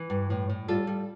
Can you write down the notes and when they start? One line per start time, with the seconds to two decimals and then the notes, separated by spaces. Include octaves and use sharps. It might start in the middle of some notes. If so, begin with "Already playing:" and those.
Already playing: E3
0.10 G2
0.30 A2
0.50 A2
0.68 G3 F4 A4
0.87 G3